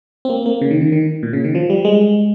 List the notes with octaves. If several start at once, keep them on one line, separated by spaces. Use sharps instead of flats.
C4
A#3
A#3
C#3
D#3
D#3
D#3
A#2
C#3
D#3
F3
G3
G#3